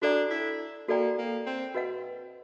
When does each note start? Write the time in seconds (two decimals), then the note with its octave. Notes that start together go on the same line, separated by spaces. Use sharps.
0.02 D4 F#4 A4 D5 G5 A#5
0.30 E4
0.88 A#3 F#4 A4 D5 G5 A#5
1.18 A#3
1.46 C4
1.75 F#4 B4 D#5 F#5